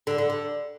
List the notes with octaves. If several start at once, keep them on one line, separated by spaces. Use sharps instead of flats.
D3
D3
D3